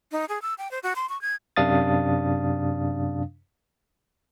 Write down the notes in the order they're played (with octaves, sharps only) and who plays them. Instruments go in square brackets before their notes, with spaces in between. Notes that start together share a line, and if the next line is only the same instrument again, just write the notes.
[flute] D#4
G#4
E6
G5
C5
F#4
C6
C#6
G#6
[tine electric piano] F#2 C3 D4 F5 D#6 A6